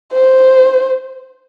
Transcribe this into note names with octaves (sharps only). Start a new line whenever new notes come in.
C5